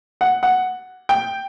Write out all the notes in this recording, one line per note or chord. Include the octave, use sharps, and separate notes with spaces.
F#5
F#5
G5